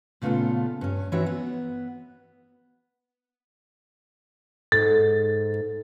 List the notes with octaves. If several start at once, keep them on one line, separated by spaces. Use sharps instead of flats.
A#2 C#3 A3 B3 F4 A4
G2 C#4
E3 C4 D#4 F#4 C#5 E5
B3
G#2 A4 A6